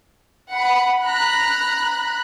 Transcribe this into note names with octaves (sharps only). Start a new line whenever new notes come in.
F#5 B5
A#5 B5 F#6